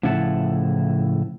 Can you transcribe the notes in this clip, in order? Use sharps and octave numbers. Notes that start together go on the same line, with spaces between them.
A2 C#3 F3 E4 F#5 A5